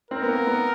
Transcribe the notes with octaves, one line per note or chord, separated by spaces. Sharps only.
C4 A#4
B3
A#3
B3